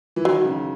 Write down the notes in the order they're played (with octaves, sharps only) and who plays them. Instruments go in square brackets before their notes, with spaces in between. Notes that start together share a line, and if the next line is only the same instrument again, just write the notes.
[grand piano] E3
[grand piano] D#3 [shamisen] F#3
[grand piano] C#3